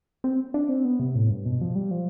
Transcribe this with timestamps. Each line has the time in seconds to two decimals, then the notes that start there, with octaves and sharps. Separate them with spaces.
0.24 C4
0.54 D4
0.69 C4
0.85 B3
1.00 C3
1.15 A2
1.30 G2
1.46 B2
1.61 F3
1.75 G3
1.91 F3